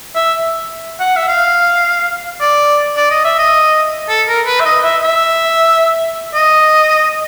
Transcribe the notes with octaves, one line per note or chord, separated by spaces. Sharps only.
E5
F#5
E5
F5
D5
D5
D#5
E5
D#5
A4
A#4
B4
E5
D#5
E5
E5
D#5